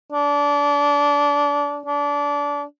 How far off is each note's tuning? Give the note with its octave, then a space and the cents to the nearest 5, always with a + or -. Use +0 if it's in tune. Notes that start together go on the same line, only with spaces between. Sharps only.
D4 -25
D4 -25